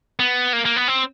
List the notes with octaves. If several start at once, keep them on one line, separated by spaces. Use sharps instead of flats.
B3
A#3
A#3
B3
C4